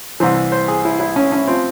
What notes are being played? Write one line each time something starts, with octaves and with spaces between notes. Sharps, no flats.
C2 C3 E3 C5
C5
G#4
E4
E4
C#4
C#4
F3 C4